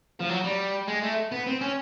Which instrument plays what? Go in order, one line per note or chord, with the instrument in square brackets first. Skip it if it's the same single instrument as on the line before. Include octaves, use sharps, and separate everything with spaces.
[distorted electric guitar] F3
F#3
G3
G#3
A3
B3
C4
C#4